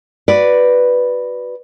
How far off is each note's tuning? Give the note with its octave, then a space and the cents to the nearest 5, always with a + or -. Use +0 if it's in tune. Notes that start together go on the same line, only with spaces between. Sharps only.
F#4 +0 B4 +0 D5 +0